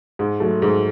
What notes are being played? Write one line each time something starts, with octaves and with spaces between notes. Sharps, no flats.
G#2
F#3 A3
G#2